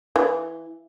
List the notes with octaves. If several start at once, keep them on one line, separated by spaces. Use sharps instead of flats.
E3